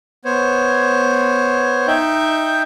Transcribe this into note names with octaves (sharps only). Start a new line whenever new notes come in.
B3 C5 C#5
D#4 E5 G5 G6